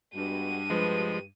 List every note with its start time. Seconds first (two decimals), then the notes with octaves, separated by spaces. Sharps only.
0.15 G2 G#3 B3 F#4 D#7
0.70 F3 G#3 B4